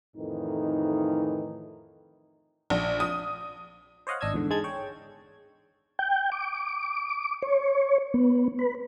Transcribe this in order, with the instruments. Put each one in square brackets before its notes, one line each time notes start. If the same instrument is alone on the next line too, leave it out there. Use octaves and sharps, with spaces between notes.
[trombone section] F2 A2 D#3 E3 D#4
[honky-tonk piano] A#1
D#6
[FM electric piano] C5 C#5 D#5 F5 F#5
G#1 D4 D#5 E6 G#6
E2 G#2 D3
G#2 G#3 A5 G#6
C#5 G5
[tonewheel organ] G5
D6
C#5
B3
B4